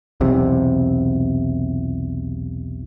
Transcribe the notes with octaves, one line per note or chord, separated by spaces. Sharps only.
B1 E2 C3